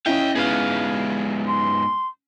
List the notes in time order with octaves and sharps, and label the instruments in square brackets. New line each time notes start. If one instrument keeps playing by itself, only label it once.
[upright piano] C#4 E4 [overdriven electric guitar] D#5 F5 [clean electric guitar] G5
[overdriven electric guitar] G#2 B3 [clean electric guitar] G#4 B4 F5
[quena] C6